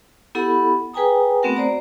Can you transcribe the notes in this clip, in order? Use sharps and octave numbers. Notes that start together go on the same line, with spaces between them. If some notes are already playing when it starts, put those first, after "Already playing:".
B3 E4 G4 A4 F#5 B5
G#4 B4 G5 G#5 A#5 D#6
A3 B3 C4 F#4 A#4 F#5
C5 D5 A#5